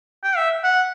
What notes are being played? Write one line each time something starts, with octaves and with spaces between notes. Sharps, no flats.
G5
E5
F#5